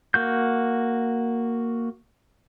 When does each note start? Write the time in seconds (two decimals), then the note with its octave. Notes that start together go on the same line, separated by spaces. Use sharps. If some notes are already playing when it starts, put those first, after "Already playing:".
0.14 A#3 F#4 G6